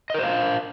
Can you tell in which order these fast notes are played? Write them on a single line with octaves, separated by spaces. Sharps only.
D#5 A#4 C5 F5